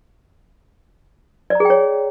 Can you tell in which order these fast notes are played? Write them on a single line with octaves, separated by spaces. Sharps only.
D5 A#5 G#4 G5 C#5